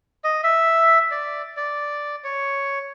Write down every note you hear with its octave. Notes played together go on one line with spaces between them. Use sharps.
D#5
E5
D5
D5
C#5